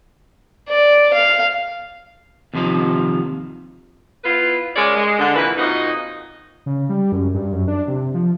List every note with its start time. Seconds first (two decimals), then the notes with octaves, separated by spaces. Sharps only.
0.68 D5
1.14 F5
2.54 D#2 C3 F3 D#4
4.24 B3 E4 F4 B4
4.76 C#3 G#3 A#4 C#5 D5
4.96 G#3
5.19 D3
5.36 F2 A#2 E3 A#3 B4
5.58 F2 A#2 F3 D#4 F#4 D#5
6.66 C#3
6.89 G3
7.12 F#2
7.35 G2
7.52 F#2
7.68 D4
7.88 C3
8.14 F3